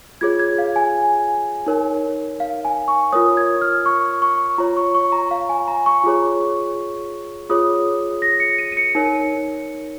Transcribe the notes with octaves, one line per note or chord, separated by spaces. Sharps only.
F4 G#4 C#5 G#6
G#6
F5
G#5
D#4 A#4 C#5
F5
G#5
C#6
F4 A#4 C#5 D#6
G#6
F6
C#6
C#6
F4 C#5 A#5
C#6
C#6
A#5
F5
G#5
A#5
C#6
F4 G#4 C#5
F4 G#4 C#5 D#6
A#6
C#7
D#7
D#7
C#7
D#4 A#4 C#5